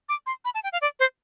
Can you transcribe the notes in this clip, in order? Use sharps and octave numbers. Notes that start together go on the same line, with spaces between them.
D6
C6
B5
A5
G5
F5
D5
C5